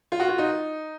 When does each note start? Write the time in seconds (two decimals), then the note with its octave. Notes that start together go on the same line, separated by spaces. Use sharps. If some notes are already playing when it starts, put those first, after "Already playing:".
0.12 F4
0.20 F#4
0.29 F4
0.38 D#4